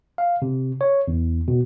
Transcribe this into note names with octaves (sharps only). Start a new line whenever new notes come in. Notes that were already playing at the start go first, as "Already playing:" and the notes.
F5
C3
C#5
E2
B2